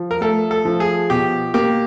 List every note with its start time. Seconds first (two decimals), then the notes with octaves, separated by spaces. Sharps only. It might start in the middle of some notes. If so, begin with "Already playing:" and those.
Already playing: F3
0.11 A#4
0.21 A3 A4
0.51 A4
0.65 F3
0.80 G#4
1.10 B2 G4
1.54 A#3 G4